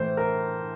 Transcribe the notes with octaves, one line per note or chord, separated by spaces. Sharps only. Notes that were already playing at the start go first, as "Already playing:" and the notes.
Already playing: A2 E3 A3 C5
A#4